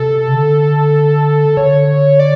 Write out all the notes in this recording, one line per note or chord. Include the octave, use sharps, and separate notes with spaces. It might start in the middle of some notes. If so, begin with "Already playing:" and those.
Already playing: C3 A4
C#3
D3
D3 C#5
D5